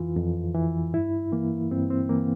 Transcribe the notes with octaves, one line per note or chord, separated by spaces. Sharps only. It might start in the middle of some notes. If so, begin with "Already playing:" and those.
Already playing: F2 E3 F4
F2
E3
G2 E4
E3 A#3
G2 C4
C4
E3 A#3